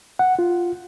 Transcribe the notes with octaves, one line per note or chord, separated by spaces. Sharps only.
F#5
F4